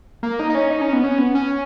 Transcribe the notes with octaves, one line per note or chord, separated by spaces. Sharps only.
A#3
D#4
D#4
C#4
D#4
C#4
B3
C#4
B3
C#4